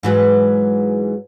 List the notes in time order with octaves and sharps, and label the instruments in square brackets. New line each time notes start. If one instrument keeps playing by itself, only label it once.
[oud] G#2 E3 F#3